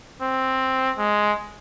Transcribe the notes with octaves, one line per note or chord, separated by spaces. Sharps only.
C4
G#3